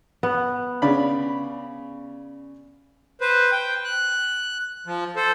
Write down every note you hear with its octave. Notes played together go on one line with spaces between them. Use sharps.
B3
C#3 D5 B5
B4 C5
G5
F#6
F3
A4 C5